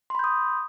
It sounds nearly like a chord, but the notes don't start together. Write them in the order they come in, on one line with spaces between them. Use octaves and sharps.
C6 B5 G6 D#6